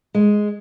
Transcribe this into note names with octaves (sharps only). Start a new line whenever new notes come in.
G#3